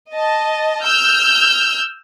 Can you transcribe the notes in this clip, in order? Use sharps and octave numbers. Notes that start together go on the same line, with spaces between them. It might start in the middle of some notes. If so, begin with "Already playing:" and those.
D#5 A5
E6 F6 G6